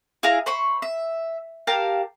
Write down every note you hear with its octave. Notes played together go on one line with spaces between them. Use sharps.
E4 G#4 F5 A#5
C5 B5 C#6
E5
G4 A#4 F5 A5